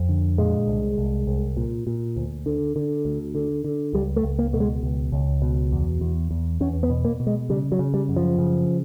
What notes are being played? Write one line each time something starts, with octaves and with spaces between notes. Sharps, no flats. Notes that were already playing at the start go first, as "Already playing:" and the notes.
Already playing: F2
D3
A#2 G#3
C2
C2
C2
A#2
A#2
D2
D3
D3
D2
D3
D3
C#2 G3
A3
C#2
A#3
B2 A3
G#3
C#2
C#2
B2
E2
E2
E2
E2 C#4
B3
B2
A#3
B2
G#3
C#3 G3
F#3
C#3
G3
F#2
F3
C#3